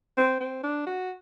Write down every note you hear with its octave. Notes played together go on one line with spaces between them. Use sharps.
C4
C4
D4
F#4